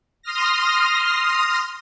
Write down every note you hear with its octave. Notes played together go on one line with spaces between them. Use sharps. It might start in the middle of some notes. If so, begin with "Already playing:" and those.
C6 D#6 F6 A#6